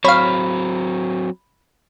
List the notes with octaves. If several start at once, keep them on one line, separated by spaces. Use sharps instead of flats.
F#3 C4 C#5 F5 B5